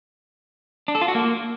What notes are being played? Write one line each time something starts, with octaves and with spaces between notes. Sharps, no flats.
D4
A4
F4
F#4
A#3